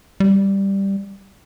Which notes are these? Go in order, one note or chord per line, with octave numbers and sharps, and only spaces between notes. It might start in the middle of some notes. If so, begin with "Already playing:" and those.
G3